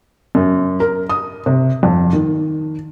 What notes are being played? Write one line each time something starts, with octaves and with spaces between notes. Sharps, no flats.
F#2
A#4
D#6
C3
F2
D#3